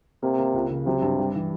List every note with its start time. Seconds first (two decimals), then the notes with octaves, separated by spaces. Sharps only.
0.22 C3 A#3
0.38 A#3
0.54 C#2
0.70 C#3
0.86 C3 F#3
1.02 G2
1.19 G3
1.35 E3